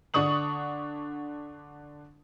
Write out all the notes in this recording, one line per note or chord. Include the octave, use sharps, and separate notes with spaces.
D3 D4 C#6 D#6 F#7